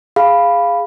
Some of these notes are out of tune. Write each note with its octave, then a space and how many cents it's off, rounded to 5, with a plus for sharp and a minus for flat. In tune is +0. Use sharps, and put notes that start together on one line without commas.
G#4 -10 F5 -5 B5 +0